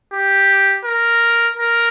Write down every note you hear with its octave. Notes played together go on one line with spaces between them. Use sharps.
G4
A#4
A#4